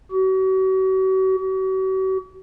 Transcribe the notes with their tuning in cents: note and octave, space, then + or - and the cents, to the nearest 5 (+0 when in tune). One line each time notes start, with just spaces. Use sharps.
F#4 +40
F#4 +45